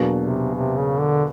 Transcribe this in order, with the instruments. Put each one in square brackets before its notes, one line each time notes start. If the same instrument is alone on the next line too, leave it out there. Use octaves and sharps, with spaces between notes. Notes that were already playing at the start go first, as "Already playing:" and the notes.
Already playing: [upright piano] E2 B2 F#3 A#3 D4
[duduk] C3
C3
C#3
D3